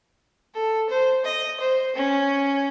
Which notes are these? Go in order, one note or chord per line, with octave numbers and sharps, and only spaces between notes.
A4
C5
D#5
C5
C#4